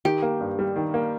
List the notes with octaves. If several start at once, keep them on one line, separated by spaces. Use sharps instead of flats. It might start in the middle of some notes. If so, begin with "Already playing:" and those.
D#3 G4
A#3
G2
G3
D#3
A#3